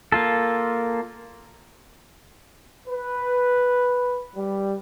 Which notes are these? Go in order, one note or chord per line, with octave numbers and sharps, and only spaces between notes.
A#3 F4 A4
B4
G3